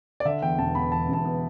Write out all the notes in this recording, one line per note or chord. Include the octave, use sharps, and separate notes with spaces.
D5
D3 E5
E2 G5
E1 A5
B3 B5
E2 A5
E1 A5
B3